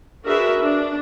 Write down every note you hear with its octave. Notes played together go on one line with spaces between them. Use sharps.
D4 F#4 G#4 A#4 B4 E5
D4